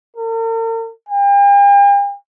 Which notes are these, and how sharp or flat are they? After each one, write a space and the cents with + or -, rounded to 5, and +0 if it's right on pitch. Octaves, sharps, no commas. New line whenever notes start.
A#4 -45
G5 +45